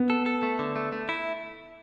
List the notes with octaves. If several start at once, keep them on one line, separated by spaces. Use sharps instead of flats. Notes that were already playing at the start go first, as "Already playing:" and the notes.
Already playing: B3
A4
A4
A3
D3
A3
A3
E4